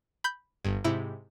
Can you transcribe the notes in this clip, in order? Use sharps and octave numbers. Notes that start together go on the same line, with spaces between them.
B5 G6
G1 G2
G#2 C3 E4